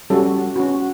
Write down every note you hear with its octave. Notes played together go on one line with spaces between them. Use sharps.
G3 C#4 F#4 A4
C#4 F#4